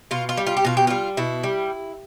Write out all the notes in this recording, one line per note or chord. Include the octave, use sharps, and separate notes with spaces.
B2 F4
F4
G3
F4
G4
B2 F4
G4
G3 F4
B2 E4
G3